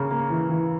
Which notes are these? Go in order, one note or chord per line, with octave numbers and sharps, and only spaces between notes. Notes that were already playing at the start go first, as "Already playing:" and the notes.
Already playing: C#3 A#3
A#3
E3
E3